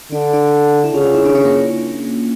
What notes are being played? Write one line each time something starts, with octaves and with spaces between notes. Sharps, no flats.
D3 D4
D4
E4
C#3 F4
F4
E4
D4
C#4
A#3